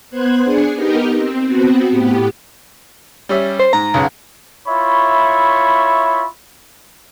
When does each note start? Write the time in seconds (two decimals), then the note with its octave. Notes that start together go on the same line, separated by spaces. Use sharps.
0.10 B3 C5 F#6 G#6
0.44 D4 G#4 G#5 C#7
0.75 B3 D#4 G4 A#4 D#5
1.15 C4
1.46 B3 C4 F#4
1.90 A2 B3 G4
3.29 G3 C#4 E5
3.60 C5
3.73 G#2 A#5
3.94 B1 C#3 F#5
4.68 E4 F4 C#5 E5 B5 C#6